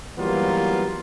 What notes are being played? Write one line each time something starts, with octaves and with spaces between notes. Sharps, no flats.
E3 F#3 G3 A#3 B3 F4